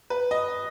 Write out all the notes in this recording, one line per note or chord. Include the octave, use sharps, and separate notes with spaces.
B4
D#5